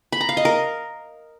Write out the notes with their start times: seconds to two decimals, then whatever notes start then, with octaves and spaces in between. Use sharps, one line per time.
0.12 B5
0.21 A#5
0.29 F5
0.37 D#5
0.45 A#4